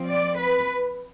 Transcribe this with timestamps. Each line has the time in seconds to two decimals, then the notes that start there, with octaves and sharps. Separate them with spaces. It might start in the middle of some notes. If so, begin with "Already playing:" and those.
Already playing: F3 C4
0.09 D5
0.39 B4